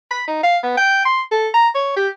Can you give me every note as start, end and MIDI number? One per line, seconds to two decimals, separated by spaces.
0.11 0.23 83
0.28 0.42 63
0.43 0.58 77
0.63 0.74 59
0.77 1.05 79
1.05 1.21 84
1.31 1.48 69
1.54 1.68 82
1.74 1.92 73
1.96 2.08 67